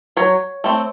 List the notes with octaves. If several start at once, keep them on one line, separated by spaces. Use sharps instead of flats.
F#3 C#5
A3 C4